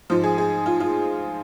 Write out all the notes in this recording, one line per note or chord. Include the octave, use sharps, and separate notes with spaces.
G#2 F3 F4
G#4
G#4
F4
F4